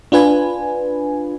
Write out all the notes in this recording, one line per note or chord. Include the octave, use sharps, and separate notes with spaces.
D4 F4 B4 G#5